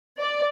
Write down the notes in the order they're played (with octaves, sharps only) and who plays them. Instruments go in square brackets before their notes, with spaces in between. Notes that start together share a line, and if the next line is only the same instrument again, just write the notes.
[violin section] D5